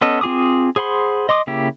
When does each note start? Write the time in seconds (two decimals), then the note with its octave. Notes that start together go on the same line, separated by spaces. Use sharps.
0.01 B3 C#4 A4 D#5
0.21 C4 F4 G#4 D6 D#6
0.76 G#4 C5 F#5 B5 C6
1.29 D#5 C6 D6 D#6
1.47 C#3 A#3 E4 G4